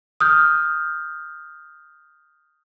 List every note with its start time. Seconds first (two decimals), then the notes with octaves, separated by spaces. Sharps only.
0.21 D#6 F6 G6